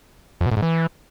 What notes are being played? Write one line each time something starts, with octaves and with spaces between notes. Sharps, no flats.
F2
B2
A2
G#2
E3